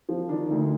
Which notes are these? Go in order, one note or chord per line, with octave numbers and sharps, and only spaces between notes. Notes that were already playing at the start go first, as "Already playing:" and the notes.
F3 C4
D#3 D4
D2 D#4